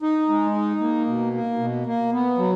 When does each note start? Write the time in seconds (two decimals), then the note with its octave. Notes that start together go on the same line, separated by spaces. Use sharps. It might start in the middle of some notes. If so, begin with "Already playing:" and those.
0.02 D#4
0.29 G#3
0.55 D#4
0.81 A#3
1.07 B2
1.33 A#3
1.59 B2
1.86 A#3
2.13 B3
2.38 F#3